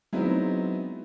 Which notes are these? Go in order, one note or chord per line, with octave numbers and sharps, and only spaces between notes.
F#3 G#3 B3 C4 D#4 E4